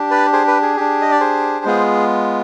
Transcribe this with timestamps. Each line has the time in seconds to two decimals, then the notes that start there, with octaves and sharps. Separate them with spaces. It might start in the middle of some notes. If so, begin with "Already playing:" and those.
Already playing: D4 G4
0.11 B4 D5
0.33 G#4 C5
0.48 B4
0.62 G#4
0.77 D4 G4
1.02 D#5
1.11 D5
1.20 G#4 C5
1.65 G#3 B3 F4 G#4